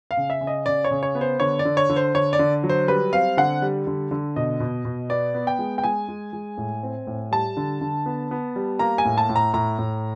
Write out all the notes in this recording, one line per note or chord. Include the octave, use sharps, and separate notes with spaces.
F5
C#3
E5
C#3
D#5
C#3 D5
C#5
C#3
C#5
B3
C5
D3 C#5
D5
D3
C#5
D3
C5
D3 C#5
D5
D3
F#3
C5
G3 B4
C4 F5
D3 F#5
G3
D3
D3
B2 D#5
B2
B2
B3 D5
B3
G5
G#3
G5
G#3 G#5
G#3
G#3
A2
C4
A2
G3 A5
D3
D3
B3
B3
G3
A#3 A#5
G#5
A2
A5
A2
A#5
A2 A#5
A2